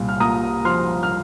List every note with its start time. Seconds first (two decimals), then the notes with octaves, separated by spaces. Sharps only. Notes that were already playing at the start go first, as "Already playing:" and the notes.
Already playing: C2 A#2
0.09 F6
0.20 A#2 A#5 D#6
0.65 F3 C6 F6
1.03 F6